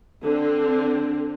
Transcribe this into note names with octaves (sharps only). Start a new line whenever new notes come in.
D3 C4